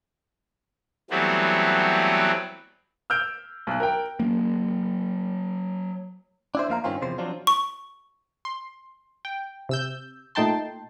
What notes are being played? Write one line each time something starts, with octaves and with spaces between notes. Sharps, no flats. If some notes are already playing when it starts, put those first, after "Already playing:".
E3 F#3 G3 A3 B3 C4
E6 F6 G6 D7
B1 F#6
A#4 G5
F#3 A#3
D4 E4 C5
F2 A#3 F5 A#5
G2 D#3 C4 C#4 F4
E2 C3 F3 C5
F3 F#3 C4 D4 F4
C#6
C6
G5
C3 E6 G6
A#2 A3 D#4 G5 A5 C6